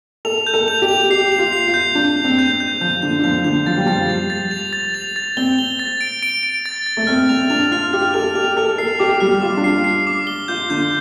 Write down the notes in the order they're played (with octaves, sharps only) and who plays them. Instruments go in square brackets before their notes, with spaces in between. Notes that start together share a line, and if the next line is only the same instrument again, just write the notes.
[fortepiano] A4 [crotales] F7
[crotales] G6
[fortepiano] A4
[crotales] F7
[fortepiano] G4
[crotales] F7
[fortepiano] G4 [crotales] C7
[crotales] F7
[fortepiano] F4
[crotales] C7
[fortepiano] F4
[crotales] G6
[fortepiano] D4 [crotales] F7
[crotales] F7
[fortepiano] C4
[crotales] G6
G6
[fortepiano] F3 [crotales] G6
[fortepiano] D3 [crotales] G6
[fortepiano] D3
[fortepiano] F3 [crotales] F7
[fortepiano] D3 [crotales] G6
[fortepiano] F3 [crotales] A6
[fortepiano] G3
[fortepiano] F3 [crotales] A6
[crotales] F7
A6
F7
A6
F7
A6
[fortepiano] C4 [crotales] G7
[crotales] G7
A6
D7
D7
D7
A6
A6
[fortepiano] A3
[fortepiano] C4 [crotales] F6
[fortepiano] C4 [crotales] F7
[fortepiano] D4 [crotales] F7
[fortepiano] F4 [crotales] F6
[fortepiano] G4 [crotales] F6
[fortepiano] A4 [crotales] F7
[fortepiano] G4 [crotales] F7
[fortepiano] A4 [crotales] F6
[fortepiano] A4 [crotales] C7
[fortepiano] G4 [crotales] D6
[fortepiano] G3 [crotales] F6
[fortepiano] F4 [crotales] D6
[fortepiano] D4
[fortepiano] F4 [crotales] C7
[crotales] C7
D6
G7
[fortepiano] F4 [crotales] G6
[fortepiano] D3 [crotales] G6